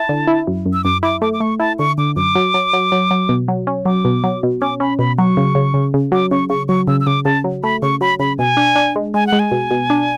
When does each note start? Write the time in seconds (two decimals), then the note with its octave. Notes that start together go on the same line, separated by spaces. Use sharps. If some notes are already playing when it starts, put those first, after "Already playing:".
Already playing: E4 A5
0.09 D3
0.27 E4
0.47 F#2
0.66 F#2
0.73 E6
0.84 F#2 D6
1.03 E4 D6
1.22 A3 D6
1.33 D6
1.40 A3 C#6
1.59 E4 A5
1.79 D3 C#6
1.98 D3 D6
2.16 F#2 D6
2.35 F#3
2.54 F#3
2.73 F#3
2.92 F#3
3.11 F#3
3.29 B2
3.48 F#3
3.67 C#4
3.85 F#3 D6
4.05 B2
4.24 F#3
4.43 B2
4.61 C#4 D6
4.80 C#4 B5
4.99 B2 B5
5.18 F#3 C#6
5.37 C#3
5.55 C#3
5.74 C#3
5.94 C#3
6.12 F#3 D6
6.31 C#3 C#6
6.50 C#3 C#6
6.68 F#3 C#6
6.88 C#3 E6
7.00 E6
7.06 C#3 D6
7.25 C#3 A5
7.44 F#3
7.63 A3 B5
7.82 C#3 C#6
8.01 F#3 B5
8.20 C#3 B5
8.38 B2 G#5
8.57 D4
8.76 D4
8.96 G#3
9.14 G#3 G#5
9.27 F#5
9.32 G#3
9.39 G#5
9.51 B2
9.71 B2
9.90 D4